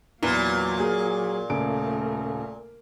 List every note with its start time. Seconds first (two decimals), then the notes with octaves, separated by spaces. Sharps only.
0.23 E2 A#2 F#3 A#3 B4 G7
0.80 G#4 A#4
1.50 D#1 C#3 A3 A#4 D7